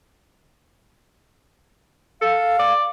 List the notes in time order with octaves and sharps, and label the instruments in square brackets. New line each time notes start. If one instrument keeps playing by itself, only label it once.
[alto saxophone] A4 [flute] F5
[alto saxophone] D5